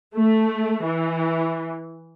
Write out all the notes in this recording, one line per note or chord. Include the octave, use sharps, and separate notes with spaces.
A3
E3